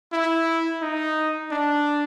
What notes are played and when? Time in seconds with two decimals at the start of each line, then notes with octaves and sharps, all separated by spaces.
0.13 E4
0.82 D#4
1.51 D4